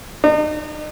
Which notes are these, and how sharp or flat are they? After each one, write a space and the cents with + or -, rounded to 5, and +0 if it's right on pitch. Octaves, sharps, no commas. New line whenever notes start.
D#4 -40